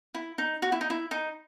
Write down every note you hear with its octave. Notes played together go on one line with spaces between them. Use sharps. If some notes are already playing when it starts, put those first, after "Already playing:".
E4
D#4
F#4
E4
D#4
E4
D#4